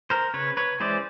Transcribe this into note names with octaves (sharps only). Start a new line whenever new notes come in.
A#4 C5
C#3 B4 C#5
B4 C#5
E3 G#3 C#4 C5 D5